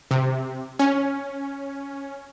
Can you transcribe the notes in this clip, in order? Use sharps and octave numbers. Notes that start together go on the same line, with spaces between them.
C3
C#4